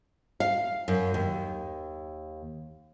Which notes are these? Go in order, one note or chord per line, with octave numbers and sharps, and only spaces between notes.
F5
F#2
D#2